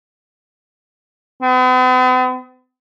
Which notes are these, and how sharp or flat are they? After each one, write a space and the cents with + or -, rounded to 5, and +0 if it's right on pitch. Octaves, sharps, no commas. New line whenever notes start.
B3 +45